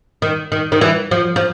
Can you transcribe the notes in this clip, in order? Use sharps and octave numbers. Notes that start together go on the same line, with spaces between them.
D#3
D#3
D#3
E3
F3
F3